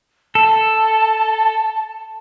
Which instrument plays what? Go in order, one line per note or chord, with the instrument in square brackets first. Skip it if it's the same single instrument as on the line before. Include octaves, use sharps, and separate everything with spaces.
[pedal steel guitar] A4 [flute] A5